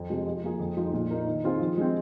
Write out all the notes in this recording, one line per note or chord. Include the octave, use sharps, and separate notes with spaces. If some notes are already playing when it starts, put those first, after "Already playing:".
Already playing: F2
C3 G#3
F3
A#3 G#4
F2
F3 G#3 D#4
A#2
A#3 D#4 A#4
D#3
C4 F4 G#4 C5
F3
G#3 C4